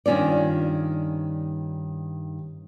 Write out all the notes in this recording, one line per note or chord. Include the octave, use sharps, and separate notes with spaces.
G2 D#3 C#4 F4 D5